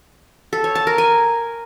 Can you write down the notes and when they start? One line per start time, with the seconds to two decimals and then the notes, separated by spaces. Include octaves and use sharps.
0.53 A4
0.64 C#5
0.75 A5
0.87 A#4
0.98 G#5